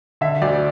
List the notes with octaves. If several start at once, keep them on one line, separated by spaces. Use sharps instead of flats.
D3 E5
D2 D5